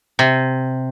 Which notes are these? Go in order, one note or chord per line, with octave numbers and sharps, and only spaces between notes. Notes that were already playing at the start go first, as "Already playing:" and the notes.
C3